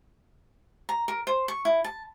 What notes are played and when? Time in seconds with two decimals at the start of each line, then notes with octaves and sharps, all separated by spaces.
0.89 A#5
1.08 A#4
1.27 C5
1.48 C#6
1.65 E4
1.84 A5